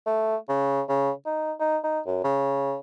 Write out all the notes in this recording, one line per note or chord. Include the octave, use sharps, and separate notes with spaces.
A3
C#3
C#3
D#4
D#4
D#4
F#2
C#3